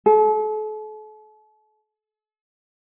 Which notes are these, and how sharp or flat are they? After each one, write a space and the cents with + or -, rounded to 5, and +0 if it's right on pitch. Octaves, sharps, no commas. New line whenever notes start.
A4 -40